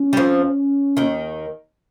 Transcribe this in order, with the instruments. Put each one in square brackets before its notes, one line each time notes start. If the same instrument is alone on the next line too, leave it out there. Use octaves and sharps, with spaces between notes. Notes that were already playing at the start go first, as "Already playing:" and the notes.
Already playing: [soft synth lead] C#4
[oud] G3
F2 F3
D#2 D#3